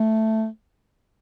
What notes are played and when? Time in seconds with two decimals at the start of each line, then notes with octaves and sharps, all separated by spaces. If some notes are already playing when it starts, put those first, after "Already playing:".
Already playing: A3